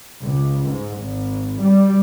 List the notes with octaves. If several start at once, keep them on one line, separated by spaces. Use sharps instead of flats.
C#2
G#2
G#1
G3